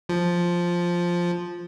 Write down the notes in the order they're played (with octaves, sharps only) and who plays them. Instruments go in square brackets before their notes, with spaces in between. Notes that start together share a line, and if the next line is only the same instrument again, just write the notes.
[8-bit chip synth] F3